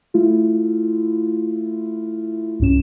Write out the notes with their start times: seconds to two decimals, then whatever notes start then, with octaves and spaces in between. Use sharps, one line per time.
0.14 A3 E4 F4
2.60 C2 G2 C#4 E7